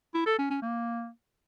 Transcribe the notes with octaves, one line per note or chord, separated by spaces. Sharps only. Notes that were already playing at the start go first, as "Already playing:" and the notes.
E4
A4
C#4
C#4
A#3